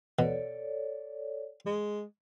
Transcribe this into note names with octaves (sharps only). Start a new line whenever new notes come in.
B2 A4 C#5 D5
G#3